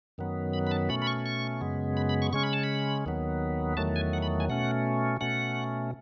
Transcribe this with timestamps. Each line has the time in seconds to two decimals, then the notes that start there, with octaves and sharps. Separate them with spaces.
0.18 F#2 D#3 F#3 B3
0.53 B5
0.67 B5
0.71 A5
0.89 B2 A3 C#4 B5
1.02 B5
1.07 C#6
1.26 C#6
1.61 F#2 C#3 G#3 B3
1.97 B5
2.09 B5
2.22 C#6
2.33 C#3 G#3 C#4 C#6
2.44 B5
2.53 A5
2.63 B5
3.06 D#2 D#3 F#3 B3
3.77 E2 D#3 F#3 A3 A5
3.96 G#5
4.13 F#5
4.22 B5
4.40 G#5
4.49 B2 A3 C#4 F#5
5.21 B2 A3 C#4 F#5